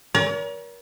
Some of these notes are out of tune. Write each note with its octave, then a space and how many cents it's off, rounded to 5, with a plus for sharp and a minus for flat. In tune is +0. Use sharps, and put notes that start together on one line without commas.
A#4 +40 C#5 +45